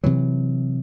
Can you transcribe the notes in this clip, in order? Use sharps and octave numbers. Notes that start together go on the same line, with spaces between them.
C3 E3 F#3